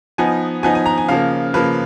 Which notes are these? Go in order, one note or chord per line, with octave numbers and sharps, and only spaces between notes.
F3 B3 D#4 G#5
F3 B3 D#4 G#5
G#5
A#5
G#5
C#3 F3 A#3 F5
C#3 F3 A#3 B4